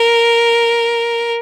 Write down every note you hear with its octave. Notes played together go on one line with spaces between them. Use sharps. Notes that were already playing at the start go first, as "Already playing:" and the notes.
Already playing: A#4